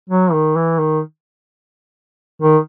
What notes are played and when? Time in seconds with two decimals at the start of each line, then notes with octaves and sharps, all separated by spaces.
0.10 F#3
0.33 D#3
0.56 E3
0.79 D#3
2.42 D#3